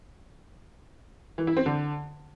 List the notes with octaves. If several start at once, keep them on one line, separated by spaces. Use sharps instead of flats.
E3
E4
C4
D3